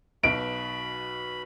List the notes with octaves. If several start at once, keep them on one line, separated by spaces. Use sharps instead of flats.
B1 B2 B5 D7